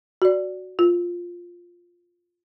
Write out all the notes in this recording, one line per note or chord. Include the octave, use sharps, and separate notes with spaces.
F#4 D5
F4